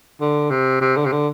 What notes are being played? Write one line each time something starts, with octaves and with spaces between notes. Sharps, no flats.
D3
C3
C3
D3
C3
D3